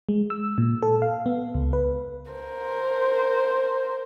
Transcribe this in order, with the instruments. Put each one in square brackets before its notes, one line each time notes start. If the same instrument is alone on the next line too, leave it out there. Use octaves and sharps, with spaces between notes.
[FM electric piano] G#3
E6
A#2
A4
F5
B3
C#2
B4
[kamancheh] A#4 C5